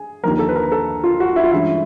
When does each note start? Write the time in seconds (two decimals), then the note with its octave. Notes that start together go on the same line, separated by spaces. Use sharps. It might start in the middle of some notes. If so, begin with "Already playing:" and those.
Already playing: G#4
0.23 D#2 D3 F3 A#3 A#4
0.39 A4
0.49 B4
0.56 A#4
0.72 A4
1.04 F4
1.20 F#4
1.36 E4
1.44 F4
1.51 G2 E3 G#3 C#4 E4